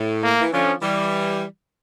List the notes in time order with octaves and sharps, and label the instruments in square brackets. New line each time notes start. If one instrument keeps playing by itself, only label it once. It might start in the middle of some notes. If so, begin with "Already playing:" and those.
Already playing: [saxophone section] A2
[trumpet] A#3
[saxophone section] E3
[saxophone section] D3 F3 [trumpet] C#4
[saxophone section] E3 G3